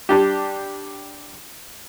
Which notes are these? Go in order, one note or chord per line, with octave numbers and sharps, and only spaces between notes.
G3 D4 G4